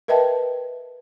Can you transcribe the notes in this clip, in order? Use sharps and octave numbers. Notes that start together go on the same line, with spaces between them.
A#4 B4 D#5 E5 G5 A5